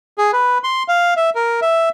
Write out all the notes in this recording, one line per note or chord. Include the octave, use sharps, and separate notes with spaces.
G#4
B4
C6
F5
E5
A#4
E5